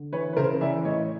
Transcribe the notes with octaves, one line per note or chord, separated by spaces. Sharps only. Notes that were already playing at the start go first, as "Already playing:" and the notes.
Already playing: D3
E3 B4 C#5
B4
C#3 A#4 C5
E3 D5 E5
A2 C#5 D#5